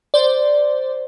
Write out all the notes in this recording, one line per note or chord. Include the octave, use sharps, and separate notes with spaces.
C5 D5